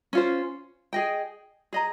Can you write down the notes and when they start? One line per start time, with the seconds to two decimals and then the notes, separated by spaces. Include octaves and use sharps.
0.13 C#4 F4 C5
0.93 G#4 D#5 G5
1.73 G#4 D#5 A#5